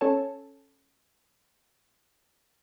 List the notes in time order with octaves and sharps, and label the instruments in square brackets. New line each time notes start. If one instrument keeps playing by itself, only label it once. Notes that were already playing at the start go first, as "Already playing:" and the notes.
[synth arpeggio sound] C#4 A4 C#5 A5